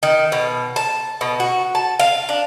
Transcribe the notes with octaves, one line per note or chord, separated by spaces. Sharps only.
D#3
B2
A5
B2
F#4
A5
F5
D4